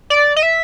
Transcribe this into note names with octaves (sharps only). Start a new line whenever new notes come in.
D5
D#5
E5